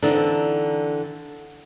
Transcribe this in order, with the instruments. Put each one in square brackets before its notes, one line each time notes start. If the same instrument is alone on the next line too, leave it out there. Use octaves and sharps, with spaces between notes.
[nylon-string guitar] D3 E3 C4 D4 D#4